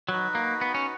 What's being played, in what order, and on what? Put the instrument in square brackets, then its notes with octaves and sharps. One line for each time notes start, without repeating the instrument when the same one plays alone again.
[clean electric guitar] F#3 [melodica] D#4 F#4 B4
[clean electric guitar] A#3
B3
C#4